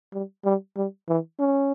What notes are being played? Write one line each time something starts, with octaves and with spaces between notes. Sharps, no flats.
G3
G3
G3
E3
C#4